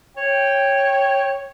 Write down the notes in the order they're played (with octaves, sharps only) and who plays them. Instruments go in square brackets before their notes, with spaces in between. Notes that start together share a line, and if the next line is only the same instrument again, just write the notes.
[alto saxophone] C#5 [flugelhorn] G5